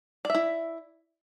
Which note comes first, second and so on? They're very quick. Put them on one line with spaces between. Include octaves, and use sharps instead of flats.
D5 E5 E4